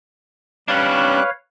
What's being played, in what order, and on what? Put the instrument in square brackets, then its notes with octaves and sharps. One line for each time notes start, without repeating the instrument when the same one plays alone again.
[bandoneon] G3 D6 F#6 [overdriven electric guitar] C#4 D4 [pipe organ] B4 C#5 F5